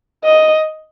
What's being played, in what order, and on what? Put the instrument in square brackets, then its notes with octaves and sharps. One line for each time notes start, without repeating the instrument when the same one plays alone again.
[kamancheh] D#5